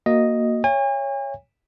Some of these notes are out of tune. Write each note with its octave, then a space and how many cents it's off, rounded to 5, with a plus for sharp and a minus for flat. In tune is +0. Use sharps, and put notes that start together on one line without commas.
A#3 +0 F#4 +0 D#5 +0
C#5 +0 E5 +30 G#5 -40